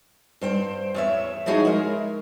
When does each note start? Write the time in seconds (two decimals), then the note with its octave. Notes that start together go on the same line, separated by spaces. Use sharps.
0.41 G2 C5 G5
0.94 E2 C#5 E5
1.46 F3 D#4 E4 F#4 G#4 C#5
1.65 G#3 A#4